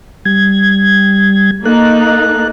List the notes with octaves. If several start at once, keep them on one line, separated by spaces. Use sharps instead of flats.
G3 G#6
A#3 D#4 A4 F#6